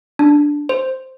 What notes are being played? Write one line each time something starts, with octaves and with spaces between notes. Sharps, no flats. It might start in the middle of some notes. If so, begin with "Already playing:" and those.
D4
C5